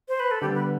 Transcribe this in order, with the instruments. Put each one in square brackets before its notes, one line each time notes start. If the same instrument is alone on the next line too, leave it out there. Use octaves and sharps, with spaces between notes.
[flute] C5
B4
A4
[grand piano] D3 G3 B3 [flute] G4
[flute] B4